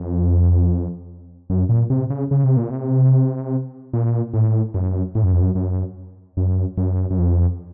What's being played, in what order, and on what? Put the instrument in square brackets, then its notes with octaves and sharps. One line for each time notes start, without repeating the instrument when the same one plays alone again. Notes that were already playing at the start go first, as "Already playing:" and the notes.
Already playing: [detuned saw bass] F2
F#2
A#2
C3
C#3
C#3
C3
A#2
C3
A#2
A2
F#2
A2
F#2
F2
F#2
F#2
F#2
F#2
F#2
F2